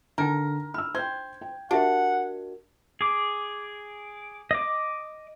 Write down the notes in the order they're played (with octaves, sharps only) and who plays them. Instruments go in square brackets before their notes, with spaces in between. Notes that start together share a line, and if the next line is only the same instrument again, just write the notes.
[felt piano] D3 [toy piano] D4 D#4 G5 [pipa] A#4
[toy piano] B5 [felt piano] E6 F6
[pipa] C5 [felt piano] G5 G#6
[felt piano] G5
[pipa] D4 [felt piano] F#4 A#4 [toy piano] G4 E5 [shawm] F#5
[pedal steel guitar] G#4 D6
D#5 D6